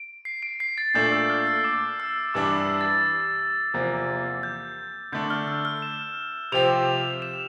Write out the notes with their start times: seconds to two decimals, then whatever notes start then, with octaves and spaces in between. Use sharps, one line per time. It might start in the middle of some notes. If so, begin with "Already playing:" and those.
Already playing: D7
0.25 C7
0.43 D7
0.60 C7
0.78 A6
0.94 A#2 A3 D4 A4 G6
1.12 E6
1.30 F6
1.47 E6
1.64 D6
2.00 E6
2.34 G2 E3 G3 D4 D6
2.58 E6
2.81 A6
3.74 E2 C3 F3 A#3
4.43 G6
5.12 D3 A3 D4 G6
5.30 F6
5.48 E6
5.65 F6
5.82 E7
6.52 C3 F3 C4 G4 F7
7.22 E7